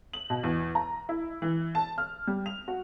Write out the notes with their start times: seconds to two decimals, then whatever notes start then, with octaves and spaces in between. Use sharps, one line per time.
0.13 F#7
0.30 B2
0.43 E2
0.75 A#5
1.09 E4
1.42 E3
1.75 A5
1.98 F6
2.27 G3
2.46 F7
2.68 F#4